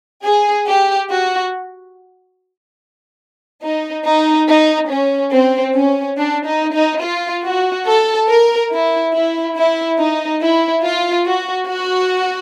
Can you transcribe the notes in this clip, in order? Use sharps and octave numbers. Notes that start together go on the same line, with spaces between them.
G#4
G4
F#4
D#4
D#4
D#4
C#4
C4
C#4
D4
D#4
D#4
F4
F#4
A4
A#4
E4
E4
E4
D#4
E4
F4
F#4
F#4